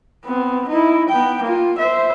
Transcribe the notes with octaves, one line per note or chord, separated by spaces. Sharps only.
B3 C4
D#4 E4
B3 G5
A#3 F4
C5 E5